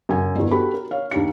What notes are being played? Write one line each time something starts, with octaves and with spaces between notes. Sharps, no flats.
F#2 C#3 G#5
G1 E2
F#4 G4 A4 B5
A#4
C#5 F5
D#2 D4 G4 C#7